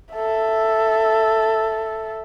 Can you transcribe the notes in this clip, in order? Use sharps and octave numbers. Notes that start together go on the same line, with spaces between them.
A4 E5